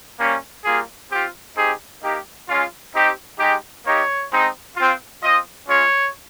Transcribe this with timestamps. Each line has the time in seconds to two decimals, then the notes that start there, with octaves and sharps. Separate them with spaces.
0.19 G3 A#3 C#4
0.64 G3 A#3 F4 G#4
1.11 C4 F4 G4
1.56 C4 D#4 G4 G#4
2.02 A#3 D#4 G4
2.48 G#3 C#4 F4
2.94 C4 D#4 G4
3.39 G#3 D#4 G4
3.85 A#3 D#4 G4 C#5
4.31 G#3 C4 D#4
4.76 C4 F4
5.22 C4 F4 D#5
5.68 G#3 C#4 F4 C#5